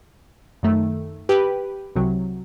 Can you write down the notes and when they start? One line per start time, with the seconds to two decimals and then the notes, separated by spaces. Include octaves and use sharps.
0.63 F#2 D#3 A3
1.29 G4 B4
1.96 C2 C3 F#3